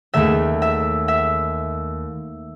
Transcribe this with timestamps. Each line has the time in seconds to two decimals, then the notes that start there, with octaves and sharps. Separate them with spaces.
0.14 D#2 D#3 A3 E5
0.62 E5
1.08 E5